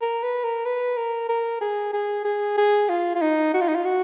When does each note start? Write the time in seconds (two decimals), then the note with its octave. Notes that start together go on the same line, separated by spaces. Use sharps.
0.02 A#4
0.23 B4
0.44 A#4
0.65 B4
0.97 A#4
1.29 A#4
1.61 G#4
1.93 G#4
2.25 G#4
2.58 G#4
2.89 F4
3.15 F4
3.21 D#4
3.54 F#4
3.61 F4
3.68 D#4
3.75 F4
3.85 F#4